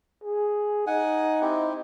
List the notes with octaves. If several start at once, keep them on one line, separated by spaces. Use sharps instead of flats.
G#4
D#4 F#5 G#5
C4 E4 G4